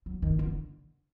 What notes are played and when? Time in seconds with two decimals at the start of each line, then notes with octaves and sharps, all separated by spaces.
0.06 F#3
0.22 D#3
0.39 D3